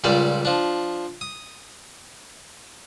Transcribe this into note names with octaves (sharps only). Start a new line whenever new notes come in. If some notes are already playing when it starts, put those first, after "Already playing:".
C#2 A#2 G3 D5 G5
F3 D4
D#6